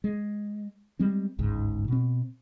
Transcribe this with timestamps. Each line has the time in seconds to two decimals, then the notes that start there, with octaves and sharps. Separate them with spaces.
0.04 G#3
0.99 G3 G#3 C4
1.39 G1 C#2 G#2
1.88 B2 C4